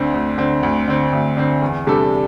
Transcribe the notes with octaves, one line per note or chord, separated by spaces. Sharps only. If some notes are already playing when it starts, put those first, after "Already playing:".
Already playing: D2 D3 C4
D2
D3 C4
D2
D3 C4
D2
D3 C4
E2
C3 G3 D4 A4